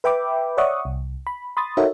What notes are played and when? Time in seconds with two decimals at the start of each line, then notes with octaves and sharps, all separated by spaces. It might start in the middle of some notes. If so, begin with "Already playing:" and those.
0.04 B4 E5 G5 B5 D6
0.57 C#5 D5 E5 F#5 C#6 D#6
0.85 C2
1.27 B5
1.57 B5 C6 D#6 A6
1.77 D#4 F#4 A4 A#4 C#5 E5